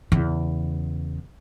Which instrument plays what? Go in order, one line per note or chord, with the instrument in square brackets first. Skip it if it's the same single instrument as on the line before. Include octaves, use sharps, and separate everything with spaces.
[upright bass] E2 C#3